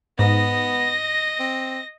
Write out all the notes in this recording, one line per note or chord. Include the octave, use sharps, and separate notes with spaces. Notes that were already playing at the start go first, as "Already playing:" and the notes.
G#2 B3 D#5 A#6
C4